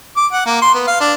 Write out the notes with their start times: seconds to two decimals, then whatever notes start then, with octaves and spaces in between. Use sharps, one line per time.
0.16 D6
0.32 F#5
0.46 A#3
0.62 C6
0.75 B3
0.88 F5
1.00 D4